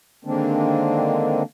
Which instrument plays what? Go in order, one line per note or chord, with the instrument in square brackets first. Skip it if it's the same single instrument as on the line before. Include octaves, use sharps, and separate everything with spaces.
[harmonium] D3 D#3 G#3 A#3 C4 D4